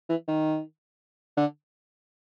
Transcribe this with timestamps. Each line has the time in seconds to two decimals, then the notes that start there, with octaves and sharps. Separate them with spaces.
0.10 E3
0.28 D#3
1.37 D3